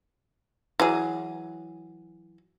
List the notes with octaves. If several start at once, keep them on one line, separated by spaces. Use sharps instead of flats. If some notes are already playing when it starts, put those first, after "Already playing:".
E3 F#3 G#4